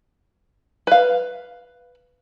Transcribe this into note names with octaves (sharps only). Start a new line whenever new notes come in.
B4 F5